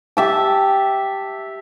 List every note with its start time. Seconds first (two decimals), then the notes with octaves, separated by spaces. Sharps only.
0.17 G4 E5 A5